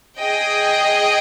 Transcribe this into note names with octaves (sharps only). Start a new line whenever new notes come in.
G#4 D#5 G5